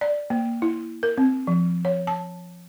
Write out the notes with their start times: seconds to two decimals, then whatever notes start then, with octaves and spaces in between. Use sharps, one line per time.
0.01 D5
0.30 A#3
0.62 E4
1.03 A#4
1.17 C4
1.47 F3
1.85 C#5
2.07 A5